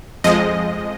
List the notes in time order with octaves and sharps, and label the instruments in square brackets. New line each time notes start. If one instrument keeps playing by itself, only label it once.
[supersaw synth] F2 F3 G#3 D#5